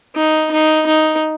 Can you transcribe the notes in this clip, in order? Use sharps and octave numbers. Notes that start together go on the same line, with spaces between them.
D#4
D#4
D#4